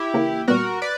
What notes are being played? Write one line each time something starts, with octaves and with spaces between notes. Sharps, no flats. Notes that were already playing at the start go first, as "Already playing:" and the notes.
Already playing: E4 G4
C#3 E3 A#3
A#2 G3 B3 F#4 A#4
B4 D5